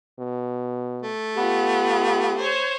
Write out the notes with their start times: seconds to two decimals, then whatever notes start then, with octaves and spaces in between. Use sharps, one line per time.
0.20 B2
1.03 A3
1.37 B3 F4 G4
2.37 C5 C#5